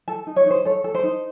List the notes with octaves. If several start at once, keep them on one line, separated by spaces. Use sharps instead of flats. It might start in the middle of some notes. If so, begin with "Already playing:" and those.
A4 A5
D#4
C#5
D#4 C5
A4 C#5
A4
C5
D#4